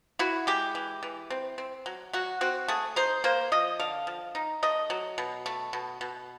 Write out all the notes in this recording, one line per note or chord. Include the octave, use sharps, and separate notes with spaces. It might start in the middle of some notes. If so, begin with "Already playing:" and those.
E4 F#4
G#3 G4
E3
E3
C4
C4
F#3
F#3 F#4
C4 F#4
A3 G#4
D#4 C5
A#3 C5
F3 D#5
D3 F5
F3
D#4
A3 D#5
F#3
B2
A3
B2
B2